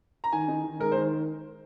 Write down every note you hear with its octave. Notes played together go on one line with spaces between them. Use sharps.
A#5
D#3 G#5
D#4
D#3
G#3 A#4
C5
D#3